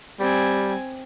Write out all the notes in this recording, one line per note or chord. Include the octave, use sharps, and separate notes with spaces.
G3 C4 G#5